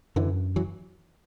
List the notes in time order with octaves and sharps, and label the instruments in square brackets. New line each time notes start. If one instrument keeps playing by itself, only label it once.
[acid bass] F#2 [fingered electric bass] D3 E3
[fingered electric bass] E3 F#3